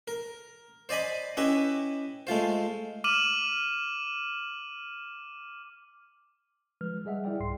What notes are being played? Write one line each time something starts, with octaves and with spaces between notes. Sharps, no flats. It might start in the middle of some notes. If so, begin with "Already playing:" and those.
A#4
C5 D5 D#5 G#5 B5
C#4 E4 G4 B4 D#5 E5
G#3 A3 F4 C5
D6 F6 D#7 E7 F#7
F3 G#3 B4 F6
G3 G#4 D#5 E5 F#5
E4 G#4 D5 G5
C2 G#2 C6 C7